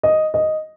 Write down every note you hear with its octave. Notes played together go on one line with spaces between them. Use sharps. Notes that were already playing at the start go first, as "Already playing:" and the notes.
D#5
D#5